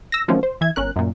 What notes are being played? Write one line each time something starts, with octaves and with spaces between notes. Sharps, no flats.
E6 A#6
D#3 F3 F#3 A3 C4 C#4
C5
E3 E5 G#6
G1 C#4 A#4 F#6
F#2 A#2